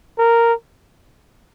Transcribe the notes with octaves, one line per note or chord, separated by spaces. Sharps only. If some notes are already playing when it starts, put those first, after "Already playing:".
A#4